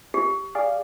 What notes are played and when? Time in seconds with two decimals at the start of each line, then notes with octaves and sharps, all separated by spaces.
0.14 G4
0.55 G#4 D5 F5